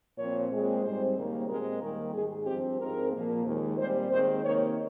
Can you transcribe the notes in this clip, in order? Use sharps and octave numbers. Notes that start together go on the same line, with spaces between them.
A#2 F3 C4 C#5
A#2 G#3 C4
G#2 G3 C4 C5
D#2 C#3 G3 A#3
A#2 G#3 C4 A#4
D#2 D#3 G3 A#3 A#4
G#2 D#3 G#3 G#4
G2 F3 C4 G4
G#2 F3 G#3 C4 A#4
A#2 F3 A#3
D#2 D#3 G#3
A#2 G3 C4 C5
D#2 D#3 G#3 C4 C5
C3 D#3 A#3 C#5